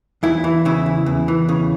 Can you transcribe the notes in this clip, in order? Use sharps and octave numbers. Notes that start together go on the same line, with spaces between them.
E2 E4
E3
C#3 E4
E2
E2
E3
C#3